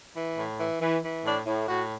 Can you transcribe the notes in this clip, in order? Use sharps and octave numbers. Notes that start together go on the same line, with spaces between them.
E3
A2
E3
E3
E3
A2 D4
A2
A2 F#4